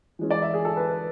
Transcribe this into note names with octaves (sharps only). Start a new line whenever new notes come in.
E3 G#3 C#4
D5
E5
G#4
A4
B4
B4